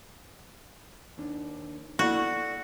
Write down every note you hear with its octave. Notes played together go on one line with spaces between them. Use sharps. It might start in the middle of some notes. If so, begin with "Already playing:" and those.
D#2 D4
A#3 B3 E4 F#4 A4 D5